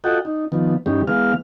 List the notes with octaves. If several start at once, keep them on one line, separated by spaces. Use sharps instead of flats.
F4 F#4 A4 D#5 F#5 G5
D#4
D#3 F3 B3
G2 E3 G3 C#4 D#4 G4
E3 G#3 B3 F5 F6